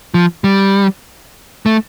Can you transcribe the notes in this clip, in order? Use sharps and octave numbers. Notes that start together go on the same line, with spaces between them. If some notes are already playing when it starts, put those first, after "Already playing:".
F3
G3
A3